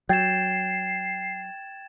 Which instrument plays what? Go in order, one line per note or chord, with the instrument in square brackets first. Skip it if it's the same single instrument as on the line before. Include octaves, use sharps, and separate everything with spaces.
[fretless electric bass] F#3 [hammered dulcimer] G5 [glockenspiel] G#6 A6 E7 [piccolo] C7